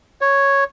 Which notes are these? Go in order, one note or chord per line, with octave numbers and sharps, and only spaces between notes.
C#5